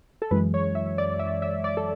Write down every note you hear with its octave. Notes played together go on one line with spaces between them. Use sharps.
A4
F#2 E3 G#3 B4
C#5
E5
D5
E5
E5
D5
A4